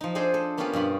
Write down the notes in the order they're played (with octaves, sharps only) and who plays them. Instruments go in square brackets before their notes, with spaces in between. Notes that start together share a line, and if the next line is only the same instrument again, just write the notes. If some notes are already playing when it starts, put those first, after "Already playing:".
[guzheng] F3 D#4
D4 G#4 A4 C5 D#5
A4
A#3 B3 C#4 F4 G4 B4
G2 B2 F4 B5